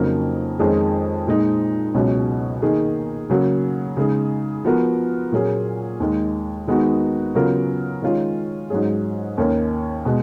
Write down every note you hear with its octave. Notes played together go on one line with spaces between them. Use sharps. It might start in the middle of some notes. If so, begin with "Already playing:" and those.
Already playing: F2 C#3 F#3 A#3 D#4
F2 D#3 G#3 C#4 G#4
A#2 G#3 D#4
C#2 B2 F#3 C#4
D#3 A#3 D#4 G#4
C#3 F#3 A#3
C#3 G#3 D#4 G#4
F3 B3 F#4 A#4
A#2 F#3 A#3 C#4 G#4
D#2 D#3 G#3
D#3 G#3 B3 D#4 F#4
C#3 F#3 B3 F4 A#4
D#3 G#3 C#4 F4
G#2 F#3 C#4 G#4
D#2 D#3 A#3 C#4
B2 G#3